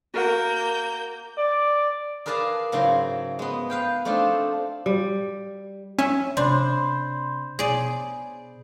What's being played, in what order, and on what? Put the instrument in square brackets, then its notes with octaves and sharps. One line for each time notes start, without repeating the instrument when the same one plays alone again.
[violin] A#3 G6 [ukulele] F#4 A#4 F#5
[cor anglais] D5
[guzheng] G#4 A#4 B4 D5 F5 A5
G#2 C#3 F#3 E4 A#5 C6
G#3 B3
B4 F5 G5
A3 C4 D4 D#4 F4
[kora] G3
[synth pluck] C#4 [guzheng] E5
[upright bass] C3 [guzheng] D4 [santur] C5 B5
[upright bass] B2 [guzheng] G#4 D5